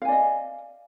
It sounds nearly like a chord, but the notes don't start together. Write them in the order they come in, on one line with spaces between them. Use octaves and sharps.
F5 G#5 D5 D#5